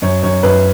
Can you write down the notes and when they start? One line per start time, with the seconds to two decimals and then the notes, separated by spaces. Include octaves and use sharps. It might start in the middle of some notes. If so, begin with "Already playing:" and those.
0.02 F#2 C#5
0.23 F#2 C#5
0.43 F#2 B4